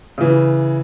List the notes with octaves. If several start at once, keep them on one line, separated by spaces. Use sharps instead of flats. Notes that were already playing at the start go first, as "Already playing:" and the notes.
C#3 E3